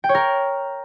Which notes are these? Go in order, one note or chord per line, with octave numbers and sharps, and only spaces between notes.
G5
C#5
A#4